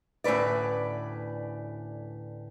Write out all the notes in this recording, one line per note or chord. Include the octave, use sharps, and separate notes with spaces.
D2 A2 C#4 B4 D5